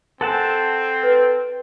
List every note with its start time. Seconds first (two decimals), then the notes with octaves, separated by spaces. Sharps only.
0.21 C4 A4 A#4 F#5 G#5 A5 C6
1.03 B4